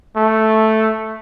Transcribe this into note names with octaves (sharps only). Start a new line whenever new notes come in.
A3